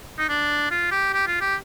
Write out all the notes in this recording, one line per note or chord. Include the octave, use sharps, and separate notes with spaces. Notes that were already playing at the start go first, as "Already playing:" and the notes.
D#4
D4
F4
G4
G4
F4
G4